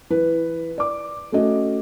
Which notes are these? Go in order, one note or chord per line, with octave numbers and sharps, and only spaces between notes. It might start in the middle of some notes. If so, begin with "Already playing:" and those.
E3 B4
D5 D6
A3 C#4 F#4 D#5